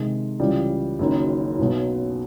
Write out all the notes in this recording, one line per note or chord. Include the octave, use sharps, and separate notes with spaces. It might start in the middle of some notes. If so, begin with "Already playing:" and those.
Already playing: C3 D#3 G#3
C#2 C#3 E3 G3
F#1 F#2 D#3
B1 B2 F#3